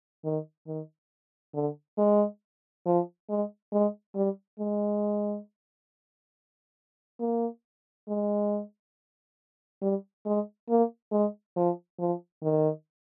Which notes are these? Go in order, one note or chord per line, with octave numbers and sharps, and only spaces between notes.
D#3
D#3
D3
G#3
F3
G#3
G#3
G3
G#3
A#3
G#3
G3
G#3
A#3
G#3
F3
F3
D#3